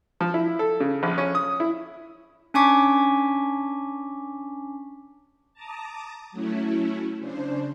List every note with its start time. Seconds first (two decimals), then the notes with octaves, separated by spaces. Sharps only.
0.21 F3
0.34 E4
0.59 A4
0.80 C#3
1.03 A#1
1.18 C#4
1.35 D#6
1.60 E4
2.54 C#4 D4 G#5 C#6 D6 B6
5.54 A5 A#5 D6 D#6
6.31 F#3 A3 C#4 E4
7.19 C#3 D4 C5